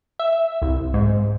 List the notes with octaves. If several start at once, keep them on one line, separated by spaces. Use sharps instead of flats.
E5
C2
G#2